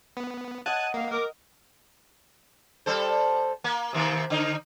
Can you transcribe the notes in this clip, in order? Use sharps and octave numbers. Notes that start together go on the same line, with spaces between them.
B3
D#5 F#5 A5 F#6 G#6 D#7
A#3 F5
A#4 D6
G3 A4 C5
A#3
C3 D#3 A#3
D3 D#4